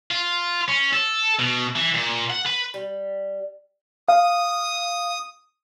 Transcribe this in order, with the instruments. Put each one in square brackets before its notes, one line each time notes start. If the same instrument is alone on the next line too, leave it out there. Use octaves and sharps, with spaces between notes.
[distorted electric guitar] F4
C#4
A4
B2
E3
A#2
F#5
B4
[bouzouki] G3
[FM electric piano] F5 [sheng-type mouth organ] D#6